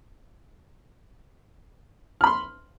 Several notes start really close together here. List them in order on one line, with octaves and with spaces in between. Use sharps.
F6 B5 C6